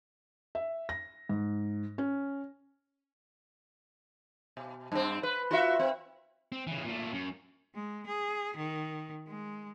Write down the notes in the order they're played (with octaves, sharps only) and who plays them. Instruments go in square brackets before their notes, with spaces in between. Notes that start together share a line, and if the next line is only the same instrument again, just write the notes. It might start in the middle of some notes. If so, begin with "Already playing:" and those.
[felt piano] E5
A#6
G#2
C#4
[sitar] B2
G2 C4
B4
F4 F#4 E5
C4
[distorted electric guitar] C4
C#3 E3
A#2 A3
F#2
[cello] G#3
G#4
D#3
G#3